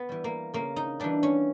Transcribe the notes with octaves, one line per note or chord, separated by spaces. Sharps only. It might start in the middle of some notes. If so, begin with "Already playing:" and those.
Already playing: B3
E3 G3
A#3
C#3 A#3
D#4
E3 G3 D4
C#4